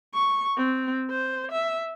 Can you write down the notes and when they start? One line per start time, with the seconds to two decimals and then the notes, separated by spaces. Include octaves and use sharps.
0.14 C#6
0.57 C4
1.10 C5
1.52 E5